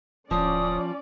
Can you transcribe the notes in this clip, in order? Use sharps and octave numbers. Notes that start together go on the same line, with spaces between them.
D1 F3 C#4 D5 D#6